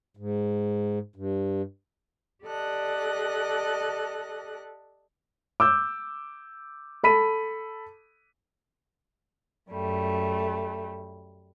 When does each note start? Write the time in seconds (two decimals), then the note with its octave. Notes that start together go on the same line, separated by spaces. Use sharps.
0.17 G#2
1.16 G2
2.45 G4 A4 D5 D#5 F#6
5.60 D6 E6 G6
7.03 A4 B5 B6 D#7
9.69 F#2 G3 A3